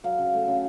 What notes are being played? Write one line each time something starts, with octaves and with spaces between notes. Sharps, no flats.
F#3 F5
C#3
A3
C#3